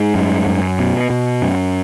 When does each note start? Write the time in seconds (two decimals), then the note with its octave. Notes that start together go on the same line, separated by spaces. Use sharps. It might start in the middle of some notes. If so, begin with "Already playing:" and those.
Already playing: G#2
0.15 F#2
0.46 F#2
0.79 B2
1.10 B2
1.42 F#2